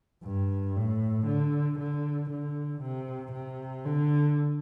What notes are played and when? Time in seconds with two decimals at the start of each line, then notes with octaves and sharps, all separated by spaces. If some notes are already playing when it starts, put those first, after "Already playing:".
0.24 G2
0.76 A2
1.27 D3
1.79 D3
2.31 D3
2.82 C3
3.33 C3
3.85 D3